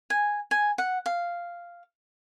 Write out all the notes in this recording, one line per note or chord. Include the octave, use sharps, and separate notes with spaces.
G#5
G#5
F#5
F5